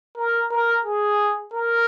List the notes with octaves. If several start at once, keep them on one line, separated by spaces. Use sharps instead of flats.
A#4
A#4
G#4
A#4